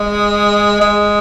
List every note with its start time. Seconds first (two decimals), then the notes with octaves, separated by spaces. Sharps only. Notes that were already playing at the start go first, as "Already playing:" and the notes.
Already playing: G#3
0.81 G#3